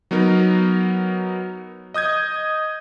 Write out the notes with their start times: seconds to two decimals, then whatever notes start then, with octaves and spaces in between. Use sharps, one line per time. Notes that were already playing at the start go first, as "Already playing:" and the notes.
0.11 F#3 B3 D#4 A#4
1.94 D#5 D#6 G6 G#6